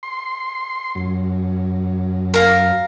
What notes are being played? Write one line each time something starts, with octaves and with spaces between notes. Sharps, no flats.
C6
F#2
A#4 F5